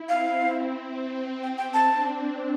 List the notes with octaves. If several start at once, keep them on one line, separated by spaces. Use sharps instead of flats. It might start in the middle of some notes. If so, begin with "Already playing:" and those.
Already playing: E4
C4 F5
C4 G5
G5
A5
D4